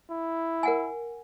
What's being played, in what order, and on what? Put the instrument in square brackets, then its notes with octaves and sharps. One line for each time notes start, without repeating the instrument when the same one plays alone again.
[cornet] E4
[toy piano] A#4 F#5 G#5